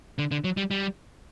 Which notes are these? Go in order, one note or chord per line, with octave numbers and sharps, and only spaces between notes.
D3
D3
F#3
G3
G3